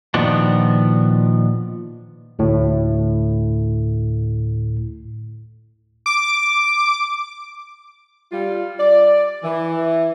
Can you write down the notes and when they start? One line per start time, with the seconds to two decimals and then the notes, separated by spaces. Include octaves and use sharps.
0.14 A#2 D#3 F3 B3 D4 F#4
2.39 D2 A2
6.06 D6
8.32 G3 F4
8.79 D5
9.44 E3